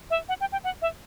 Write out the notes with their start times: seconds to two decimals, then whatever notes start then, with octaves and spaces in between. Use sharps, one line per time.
0.10 E5
0.29 F#5
0.40 G5
0.52 G5
0.64 F#5
0.82 E5